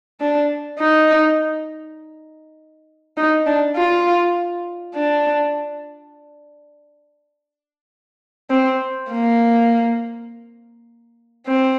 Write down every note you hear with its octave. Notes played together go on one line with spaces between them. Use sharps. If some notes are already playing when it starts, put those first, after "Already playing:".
D4
D#4
D#4
D4
F4
D4
C4
A#3
C4